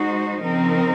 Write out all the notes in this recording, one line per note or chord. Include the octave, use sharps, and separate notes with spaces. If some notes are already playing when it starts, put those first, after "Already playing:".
Already playing: G#3 D#4 F#4 C5
C#3 F3 C4 D#4 A#4